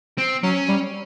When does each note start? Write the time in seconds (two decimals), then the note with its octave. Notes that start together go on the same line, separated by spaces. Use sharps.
0.18 C4
0.43 F#3 C#4
0.68 G3